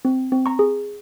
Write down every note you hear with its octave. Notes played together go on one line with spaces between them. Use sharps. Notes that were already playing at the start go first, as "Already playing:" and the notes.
C4
C4
A#5 C#6
G#4